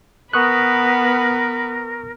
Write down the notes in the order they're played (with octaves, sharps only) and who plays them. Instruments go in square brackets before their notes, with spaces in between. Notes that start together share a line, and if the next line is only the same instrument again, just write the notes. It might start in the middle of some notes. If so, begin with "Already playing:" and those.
[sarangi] B3 [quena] A#4 [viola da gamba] B4 [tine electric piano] C#6 D#6 F#6